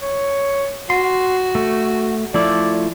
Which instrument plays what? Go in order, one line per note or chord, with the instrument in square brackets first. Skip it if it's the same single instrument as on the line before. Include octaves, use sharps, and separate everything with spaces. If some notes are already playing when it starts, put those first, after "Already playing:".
[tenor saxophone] C#5
[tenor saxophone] F#4 [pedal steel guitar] C6
[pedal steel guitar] A3
[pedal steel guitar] F3 A3 E4 [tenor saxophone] D5